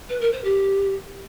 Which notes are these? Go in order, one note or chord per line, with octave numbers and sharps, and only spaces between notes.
B4
A#4
C5
G4